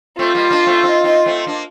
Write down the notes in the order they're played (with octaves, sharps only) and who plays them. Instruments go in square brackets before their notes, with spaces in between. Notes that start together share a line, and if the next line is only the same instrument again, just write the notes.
[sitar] A3 C4 [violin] F4
[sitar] G3 A#3
A#3 D4
A3 C4
C4 D#4
C4 D#4
A3 C4
A#3 D4